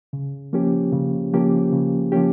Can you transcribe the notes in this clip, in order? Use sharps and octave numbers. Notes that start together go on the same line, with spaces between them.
C#3
F3 A#3 C#4 G4
C#3
F3 A#3 C#4 G4
C#3
F3 A#3 C#4 G4